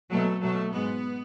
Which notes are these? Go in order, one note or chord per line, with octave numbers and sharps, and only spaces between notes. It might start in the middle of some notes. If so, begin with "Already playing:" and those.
B2 F#3 A3
B2 F#3 A3
G#2 G#3 B3